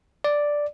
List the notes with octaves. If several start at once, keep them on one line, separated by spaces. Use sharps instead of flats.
D5